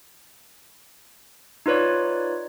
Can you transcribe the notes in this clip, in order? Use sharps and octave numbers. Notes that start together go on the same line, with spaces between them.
D#4 F4 B4 C#5 D5